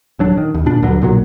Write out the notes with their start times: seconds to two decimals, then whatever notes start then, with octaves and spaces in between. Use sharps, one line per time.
0.19 D#1 F#3 D4
0.37 D#3
0.54 D#2
0.66 A#2 D4
0.82 D2 G2 D3 F#3
1.01 B1 A#2 F#3